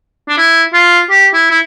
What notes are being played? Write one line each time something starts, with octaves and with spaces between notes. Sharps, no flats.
D4
E4
F4
G4
E4
E4